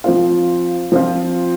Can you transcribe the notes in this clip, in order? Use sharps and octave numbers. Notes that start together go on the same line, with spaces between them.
F3 C4 F4
F3 C4 F4